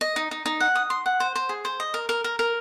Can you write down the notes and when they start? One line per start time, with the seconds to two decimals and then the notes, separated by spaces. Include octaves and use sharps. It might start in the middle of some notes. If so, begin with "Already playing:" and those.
0.01 D#5
0.16 D#4
0.31 D#4
0.46 D#4
0.60 F#5
0.75 D#6
0.90 C6
1.06 F#5
1.20 C5
1.35 C5
1.49 G#4
1.65 C5
1.80 D#5
1.94 A#4
2.09 A#4
2.24 A#4
2.39 A#4